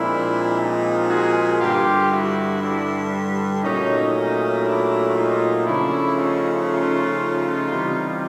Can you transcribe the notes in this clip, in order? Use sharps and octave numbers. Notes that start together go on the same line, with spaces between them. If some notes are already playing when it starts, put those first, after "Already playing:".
Already playing: A#2 F3 G#3 C4 D4 E4
D#4 F4
F#4 G#4
G2 D3 G3 F4 G4
E4 F#4
D4 E4
A#2 F#3 A3 C#4 D#4
C#4 D#4
D4 E4
D#4 F4
C#3 F3 A3 C#4 D4 E4
D#4 F4
D#4 F4
C3 E3 G3